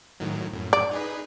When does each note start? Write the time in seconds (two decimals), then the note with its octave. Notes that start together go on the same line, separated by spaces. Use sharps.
0.20 A2 D#3 F#3
0.54 F#2 A2
0.73 D5
0.91 D#4 G#4 B4